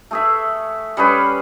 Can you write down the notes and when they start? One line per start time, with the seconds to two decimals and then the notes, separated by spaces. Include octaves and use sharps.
0.11 A3 G#4 E5
0.97 G3 C#4 G#4 B4